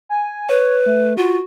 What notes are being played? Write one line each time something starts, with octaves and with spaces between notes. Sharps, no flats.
G#5
B4 C#5
A3
F4 F#4